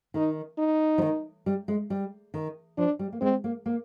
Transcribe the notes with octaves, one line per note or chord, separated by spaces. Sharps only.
D#3 D#4
D#4
F3
D#3
G3
G#3
G3
D#3
F3 D4
G3
A#3
G#3 C4
A#3
A#3